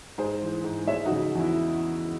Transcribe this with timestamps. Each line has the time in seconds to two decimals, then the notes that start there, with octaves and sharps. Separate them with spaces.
0.18 G#2 G#4 C5
0.42 E3
0.64 G#2
0.87 G#3 C#5 E5
1.05 D#4 F#4
1.11 C#3
1.35 E2 E4